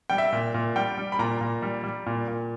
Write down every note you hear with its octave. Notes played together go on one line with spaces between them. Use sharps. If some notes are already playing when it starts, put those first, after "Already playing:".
G3 G5
E5
A#2
A#2
G3 G5
G3
B5
A#2 A#5
A#2
G3
G3
A#2
A#2